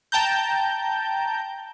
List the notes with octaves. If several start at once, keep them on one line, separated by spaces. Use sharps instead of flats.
G5 A5 A#5 G6